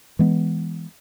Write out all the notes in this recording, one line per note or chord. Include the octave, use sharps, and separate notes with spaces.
E3 G#3 B3